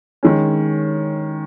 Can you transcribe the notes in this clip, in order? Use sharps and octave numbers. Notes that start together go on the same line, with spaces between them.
D#3 G#3 C#4